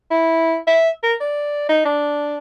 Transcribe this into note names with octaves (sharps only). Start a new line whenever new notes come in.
E4
E5
A#4
D5
D#4
D4